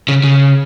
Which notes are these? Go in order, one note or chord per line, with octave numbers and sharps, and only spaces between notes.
C#3
C#3